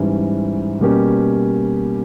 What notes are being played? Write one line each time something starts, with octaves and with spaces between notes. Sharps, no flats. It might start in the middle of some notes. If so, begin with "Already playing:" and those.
Already playing: G#2 E3 G3 C#4
B2 G3 A#3 C#4 G4